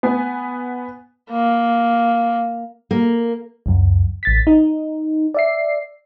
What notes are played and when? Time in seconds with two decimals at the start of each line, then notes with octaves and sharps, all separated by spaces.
0.03 B3 G#5
1.31 A#3
2.91 A#3
3.66 C#2 F#2
4.23 A1 A6 B6
4.47 D#4
5.34 D5 E5 C7